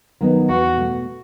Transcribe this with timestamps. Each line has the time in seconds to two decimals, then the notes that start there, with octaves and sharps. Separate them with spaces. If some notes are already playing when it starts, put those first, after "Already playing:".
0.21 D#3 F#3 B3 D#4
0.49 E2 F#4
0.76 B2 A3